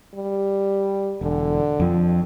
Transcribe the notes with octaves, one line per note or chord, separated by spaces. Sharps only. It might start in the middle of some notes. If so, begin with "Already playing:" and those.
G3
E1 D3
F2 F3